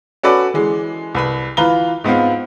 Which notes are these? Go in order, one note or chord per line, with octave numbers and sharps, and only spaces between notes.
C#4 F#4 A4 B4 D5
E3 G#3
C2 B4 B5
E3 F4 B4 A#5 G7
G#2 B3 C4 F4